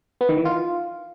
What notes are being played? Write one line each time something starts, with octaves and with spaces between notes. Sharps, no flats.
B3
D#3
E3
F4